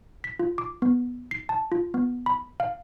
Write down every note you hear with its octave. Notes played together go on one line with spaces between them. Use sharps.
B6
F4
D6
B3
C7
A5
F4
B3
B5
F5